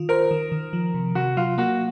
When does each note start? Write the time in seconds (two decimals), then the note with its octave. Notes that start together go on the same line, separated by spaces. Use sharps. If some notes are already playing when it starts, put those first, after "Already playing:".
Already playing: D#3 F4
0.09 A#4 C5
0.31 D#3
0.52 D#3
0.73 F3
0.94 C3
1.15 C3 F#4
1.37 F#3 F4
1.58 A#3 F#4